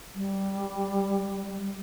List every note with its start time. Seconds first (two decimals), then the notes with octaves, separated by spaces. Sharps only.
0.15 G3